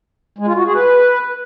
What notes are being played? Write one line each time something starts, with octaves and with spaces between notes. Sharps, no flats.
G#3
F4
F#4
G#4
B4